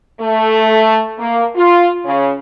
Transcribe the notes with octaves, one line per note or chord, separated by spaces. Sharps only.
A3
A#3
F4
C#3